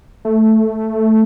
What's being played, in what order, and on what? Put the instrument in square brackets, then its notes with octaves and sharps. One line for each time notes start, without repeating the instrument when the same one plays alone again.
[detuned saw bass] A3